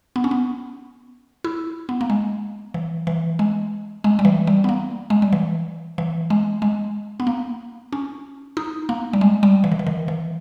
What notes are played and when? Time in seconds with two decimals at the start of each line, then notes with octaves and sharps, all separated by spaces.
0.16 B3
0.24 C#4
0.31 B3
1.44 E4
1.89 B3
2.01 A#3
2.10 G#3
2.74 E3
3.07 E3
3.39 G#3
4.04 G#3
4.19 G3
4.25 E3
4.47 G3
4.64 B3
4.69 A#3
5.10 G#3
5.22 G3
5.33 E3
5.98 E3
6.30 G#3
6.62 G#3
7.20 B3
7.27 A#3
7.93 C#4
8.57 D#4
8.89 A#3
9.13 G3
9.21 G#3
9.43 G3
9.64 E3
9.72 D#3
9.79 E3
9.87 D#3
10.08 E3